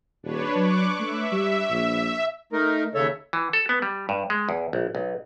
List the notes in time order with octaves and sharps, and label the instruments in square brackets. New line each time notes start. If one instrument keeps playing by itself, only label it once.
[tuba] D#1 [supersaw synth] D4 B4 C#5
[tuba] F#3 [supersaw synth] C#6 D6 F#6
[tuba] A3 [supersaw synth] E5
[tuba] G3
A#1
[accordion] A3 D#4 A#4
D#2 C#3 A4 C#5 E5
[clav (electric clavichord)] E3
A4
B3
G3
G2
G#3
E2
A#1
B1